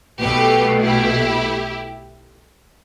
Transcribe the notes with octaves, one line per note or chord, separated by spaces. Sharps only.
B1 B2 A3 G4 B4
E4 G4